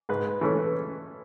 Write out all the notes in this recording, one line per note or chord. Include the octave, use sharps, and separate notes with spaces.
G#2 B4
E3 A3 C#4